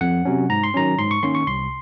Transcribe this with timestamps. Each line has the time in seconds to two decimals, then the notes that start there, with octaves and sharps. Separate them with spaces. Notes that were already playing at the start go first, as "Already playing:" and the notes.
0.01 F2 F#5
0.25 C3 F#3 C#4
0.49 G#2 A#5
0.64 C6
0.74 D#3 F#3 C#4 A#5
0.98 G#2 C6
1.11 C#6
1.23 D#3 A#3 C#4 C6
1.35 C#6
1.47 C2 C6